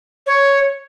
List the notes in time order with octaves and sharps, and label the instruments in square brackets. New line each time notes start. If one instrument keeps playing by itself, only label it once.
[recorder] C#5